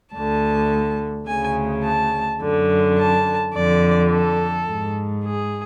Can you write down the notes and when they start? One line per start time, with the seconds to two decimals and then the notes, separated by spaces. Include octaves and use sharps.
0.14 D2 D3 A5
1.28 D2 C#3 G#5
1.85 A5
2.41 F#2 D3
2.98 A5
3.55 F2 D3 D5
4.12 A4
4.68 G#2
5.25 G#4